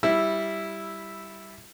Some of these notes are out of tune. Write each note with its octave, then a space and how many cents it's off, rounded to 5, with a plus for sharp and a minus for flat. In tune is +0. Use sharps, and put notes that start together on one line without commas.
G3 +0 E4 -5 E6 +0